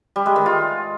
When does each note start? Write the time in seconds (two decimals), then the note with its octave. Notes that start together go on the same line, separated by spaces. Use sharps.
0.16 G3
0.26 G#3
0.36 D#3
0.46 F4